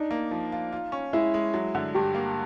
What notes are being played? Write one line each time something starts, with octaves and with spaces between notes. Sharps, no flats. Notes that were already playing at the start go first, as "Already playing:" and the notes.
Already playing: D4 D#4
A#3
F3
F4
F4
C#4
G#3 E4
G#3
F#3
D3
G2 G4
A#3